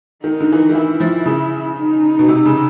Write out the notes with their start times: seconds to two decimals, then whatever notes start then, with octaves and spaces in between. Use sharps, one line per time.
0.23 D#3 D#4
0.40 D3
0.52 E3
0.57 D#3
0.69 D#3
0.75 E3 E4
1.00 F3
1.26 C#3
1.77 D#4
2.19 B2
2.28 C3
2.45 C#3